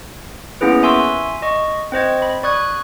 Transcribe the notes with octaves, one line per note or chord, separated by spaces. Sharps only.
A#3 B3 C#4 E4 G#4 B4
E5 G#5 C6 C#6 E6
D#5 C#6
C4 C5 D#5 G#6
B5
D5 C#6 D#6 F#6 G#6